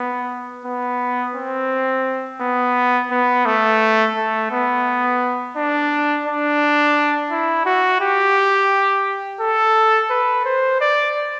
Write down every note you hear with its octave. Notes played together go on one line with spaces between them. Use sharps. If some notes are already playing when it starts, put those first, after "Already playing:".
Already playing: B3
B3
C4
B3
B3
A3
A3
B3
D4
D4
E4
F#4
G4
A4
B4
C5
D5